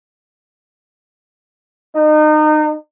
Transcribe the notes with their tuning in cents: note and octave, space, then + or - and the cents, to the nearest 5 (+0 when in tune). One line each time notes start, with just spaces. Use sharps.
D#4 -30